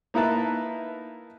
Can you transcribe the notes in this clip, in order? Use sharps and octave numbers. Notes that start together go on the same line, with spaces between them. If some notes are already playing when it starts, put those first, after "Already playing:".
A#3 D#4 E4 B4 A5